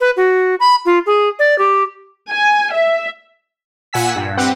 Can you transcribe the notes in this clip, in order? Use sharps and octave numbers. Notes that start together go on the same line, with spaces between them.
B4
F#4
B5
F4
G#4
D5
G4
G#5
E5
A#2 F#5 G#5 E6 B6
G2
C4 G4 B4 F#5